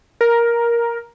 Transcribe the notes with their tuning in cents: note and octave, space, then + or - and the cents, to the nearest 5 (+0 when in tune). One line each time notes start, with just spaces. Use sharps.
A#4 +10